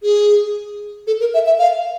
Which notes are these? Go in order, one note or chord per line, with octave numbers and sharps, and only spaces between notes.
G#4
A4
A#4
E5
E5
F5